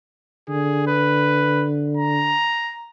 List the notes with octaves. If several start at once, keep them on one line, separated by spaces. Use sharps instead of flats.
D3 G#4
B4
A#5